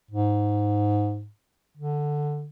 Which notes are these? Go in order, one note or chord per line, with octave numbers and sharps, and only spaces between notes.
G#2
D3